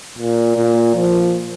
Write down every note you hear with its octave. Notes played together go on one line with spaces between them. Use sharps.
A#2
A#2
F3